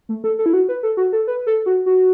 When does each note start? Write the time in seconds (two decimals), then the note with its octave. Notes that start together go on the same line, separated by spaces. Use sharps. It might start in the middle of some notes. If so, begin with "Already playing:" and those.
0.09 A3
0.24 A4
0.39 A4
0.46 E4
0.53 F#4
0.69 B4
0.83 A4
0.97 F#4
1.13 A4
1.27 B4
1.47 A4
1.66 F#4
1.86 F#4